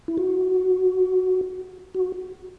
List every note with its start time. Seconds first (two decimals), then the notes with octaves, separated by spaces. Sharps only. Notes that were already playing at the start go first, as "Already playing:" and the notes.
0.08 E4
0.18 F#4
1.94 F#4